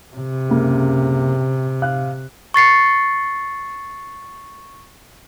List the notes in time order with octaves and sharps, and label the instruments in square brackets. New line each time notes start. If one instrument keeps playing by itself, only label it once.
[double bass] C3
[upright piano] F#1 C#2 A#3
F5 F#6
[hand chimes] C#6 A6 C7 C#7